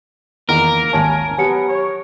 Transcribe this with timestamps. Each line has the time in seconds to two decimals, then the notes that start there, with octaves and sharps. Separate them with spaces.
0.49 E2 D#3 A#3 B3 A#4
0.93 G#1 D#2 C#5 G#5 A5
1.38 F#3 B3 G4 C#7
1.69 C#5